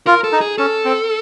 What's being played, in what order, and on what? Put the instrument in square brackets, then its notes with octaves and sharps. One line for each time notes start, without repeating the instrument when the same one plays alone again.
[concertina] F4 [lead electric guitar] A#4
[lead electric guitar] A4
[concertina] D#4
[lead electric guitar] G#4
[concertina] C#4 [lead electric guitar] A4
[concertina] C4